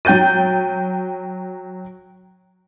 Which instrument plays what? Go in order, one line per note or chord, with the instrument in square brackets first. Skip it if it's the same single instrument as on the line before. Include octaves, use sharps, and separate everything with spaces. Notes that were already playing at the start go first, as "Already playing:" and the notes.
[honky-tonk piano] F#3 G5 G6 A6 D#7